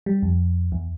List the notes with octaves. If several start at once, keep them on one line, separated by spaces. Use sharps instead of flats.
G3
F2
E2